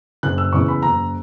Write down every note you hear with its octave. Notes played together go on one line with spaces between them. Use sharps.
F#1 F#6
E6
E2 C#3 C#6
B5
F#1 A#5